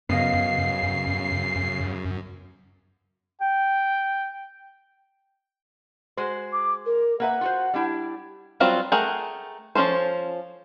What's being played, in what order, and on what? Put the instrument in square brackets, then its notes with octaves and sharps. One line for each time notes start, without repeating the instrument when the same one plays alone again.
[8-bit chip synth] F#2 [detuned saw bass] C#3 [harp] B3 D#5 F5 [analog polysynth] C7
[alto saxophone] G5
[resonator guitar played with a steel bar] G#3 F#4 C5
[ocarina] D6
A#4
[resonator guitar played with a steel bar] A#3 B4 E5 [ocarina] F#5
[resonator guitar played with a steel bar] F4 F#4 C5
G3 D4 E4
[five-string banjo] F#3 G3 C4 F4 F#4
A3 G#4 A#4 F#5 G5
F3 A#3 C#4 A4 C5